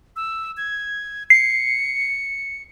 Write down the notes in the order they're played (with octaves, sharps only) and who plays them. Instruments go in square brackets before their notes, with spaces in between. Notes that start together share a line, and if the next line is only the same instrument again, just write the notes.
[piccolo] E6
G#6
[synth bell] C7 [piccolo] C#7